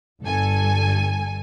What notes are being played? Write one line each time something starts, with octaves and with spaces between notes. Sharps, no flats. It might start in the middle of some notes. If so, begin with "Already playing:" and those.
G1 G2 A4 G#5